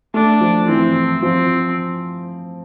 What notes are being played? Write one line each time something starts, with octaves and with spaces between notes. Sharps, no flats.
A3 D4
F3
E3 C4
F3 C4